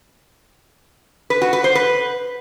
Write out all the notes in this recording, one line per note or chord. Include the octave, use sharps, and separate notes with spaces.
B4
F#4
B4
C5
B4